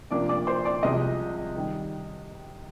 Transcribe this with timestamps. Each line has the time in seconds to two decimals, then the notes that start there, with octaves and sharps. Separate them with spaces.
0.11 C3 F3 A#3 D4 D5 D6
0.29 D5 D6
0.47 C5 C6
0.65 D5 D6
0.83 C2 C3 F3 G#3 D#5 D#6
1.57 D#3 G3